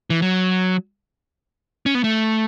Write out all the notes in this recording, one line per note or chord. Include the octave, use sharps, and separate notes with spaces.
E3
F#3
C#4
B3
A3